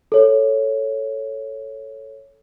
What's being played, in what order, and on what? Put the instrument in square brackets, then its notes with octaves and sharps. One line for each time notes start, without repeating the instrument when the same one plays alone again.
[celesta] A4 C#5